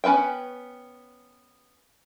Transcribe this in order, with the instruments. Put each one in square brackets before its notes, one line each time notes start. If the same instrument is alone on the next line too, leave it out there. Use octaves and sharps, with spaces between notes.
[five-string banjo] B3 C#4 B4 E5 G5